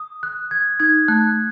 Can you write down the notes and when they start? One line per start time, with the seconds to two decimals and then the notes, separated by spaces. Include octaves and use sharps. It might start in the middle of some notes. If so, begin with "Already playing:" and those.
Already playing: D#6
0.23 F#6
0.51 G#6
0.80 D#4 G#6
1.08 A3 F#6